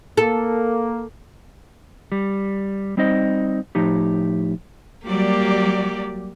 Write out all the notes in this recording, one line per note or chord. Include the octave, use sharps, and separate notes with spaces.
A#3 A4
G3
G3 C4 D#4 C5 D#5
A2 F3 D#4 G4
F#3 G3 A#3 G4 D5